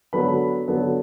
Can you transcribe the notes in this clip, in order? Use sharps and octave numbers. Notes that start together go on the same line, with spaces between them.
D3 F#3 B3 B4 B5
D3 F#3 B3